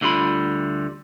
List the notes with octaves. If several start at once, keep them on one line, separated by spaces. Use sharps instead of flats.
D2 D3 G3 F4 B5